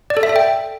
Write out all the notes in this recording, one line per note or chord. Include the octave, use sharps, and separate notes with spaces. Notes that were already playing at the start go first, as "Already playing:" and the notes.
D5
A4
E5
A4
G5